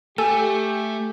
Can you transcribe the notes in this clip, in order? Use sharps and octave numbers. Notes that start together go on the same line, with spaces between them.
A3 G4 A4 G#5